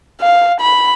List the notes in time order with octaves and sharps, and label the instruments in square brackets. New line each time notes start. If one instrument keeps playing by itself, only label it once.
[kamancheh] F5
B5